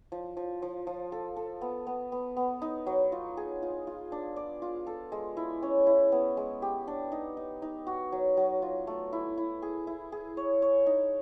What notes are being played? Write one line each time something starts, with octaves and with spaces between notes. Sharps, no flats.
F3
F3
F3
F3
A4
A4
B3
B3
B3
B3
D#4
F#3
F4
G#4
F4
F4
D4
D5
F4
A4
G#3
E4
C#4
E4
B3
G#3
G4
D4
D#4
D#4
D#4
F#4
F#3
F#3
F4
A3
E4
E4
G#4
E4
G#4
C#5
C#5
D#4